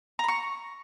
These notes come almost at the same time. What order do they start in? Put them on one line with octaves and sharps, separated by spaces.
A#5 B5 C#6